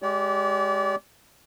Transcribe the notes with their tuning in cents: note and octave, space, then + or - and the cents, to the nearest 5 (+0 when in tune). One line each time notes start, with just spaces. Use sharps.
G#3 +0 G4 -20 D5 -35